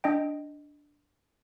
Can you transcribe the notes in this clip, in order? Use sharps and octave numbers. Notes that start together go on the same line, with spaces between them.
D4 D#5 G5